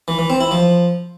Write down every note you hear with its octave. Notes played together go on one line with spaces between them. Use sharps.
E3
E3
C4
E4
F3